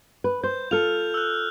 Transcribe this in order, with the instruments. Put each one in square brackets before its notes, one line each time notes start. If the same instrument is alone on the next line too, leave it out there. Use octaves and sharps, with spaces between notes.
[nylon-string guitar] B4
[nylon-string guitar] C5 [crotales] G6
[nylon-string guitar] F4 A4 [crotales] F6 F7
[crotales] E6 F#6